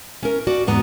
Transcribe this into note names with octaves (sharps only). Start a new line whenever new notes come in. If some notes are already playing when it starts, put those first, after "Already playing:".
C#4 A#4
F#4 D5
E2 G#2 B3 A#5